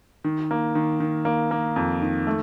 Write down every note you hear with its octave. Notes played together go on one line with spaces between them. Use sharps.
D#3
A#3
D#3
D#3
A#3
A#3
F2
D#3
A3